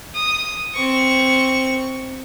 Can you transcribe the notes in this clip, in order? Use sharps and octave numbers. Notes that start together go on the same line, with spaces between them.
D#6
C4 C#6